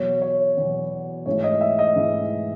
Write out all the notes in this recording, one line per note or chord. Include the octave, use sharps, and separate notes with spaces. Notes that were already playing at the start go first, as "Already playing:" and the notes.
Already playing: E2 B2 F#3 C#5
C#5
E2 B2 F#3
G#2 E3 A3 C#5
D#5
E5
D#5
G#2 E3 A3